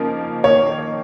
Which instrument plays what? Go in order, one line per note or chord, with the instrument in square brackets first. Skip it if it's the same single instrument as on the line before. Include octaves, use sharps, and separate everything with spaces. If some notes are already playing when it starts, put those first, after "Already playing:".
Already playing: [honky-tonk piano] C#3 F3 A#3 D#4
[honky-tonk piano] D#3 A#3 D#4 [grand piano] C#5